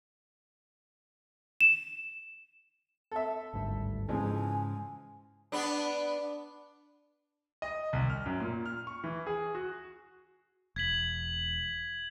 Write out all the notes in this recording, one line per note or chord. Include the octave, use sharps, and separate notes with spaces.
E7
A4 E5
G#1 D2 G2
G#2 C#3 E3 F3 G#3 G#5
B3 D4
D#5
C2
F6
F#2
A#2
F6
C#6
E3
G#4
F#4
E1 G#6 B6 F#7